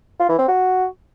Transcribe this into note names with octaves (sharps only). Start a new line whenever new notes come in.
F4
E3
C4
F#4